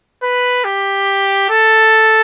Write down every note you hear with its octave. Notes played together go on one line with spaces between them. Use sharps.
B4
G4
A4